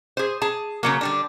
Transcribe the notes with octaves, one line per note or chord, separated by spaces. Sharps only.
G#4 C5
G#4 A5
C#3 F#3 A#3
D3 G3 D4